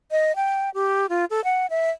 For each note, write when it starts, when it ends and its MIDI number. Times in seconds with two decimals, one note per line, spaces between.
0.11 0.35 75
0.36 0.70 79
0.74 1.07 67
1.09 1.25 65
1.30 1.41 69
1.44 1.66 78
1.70 1.90 76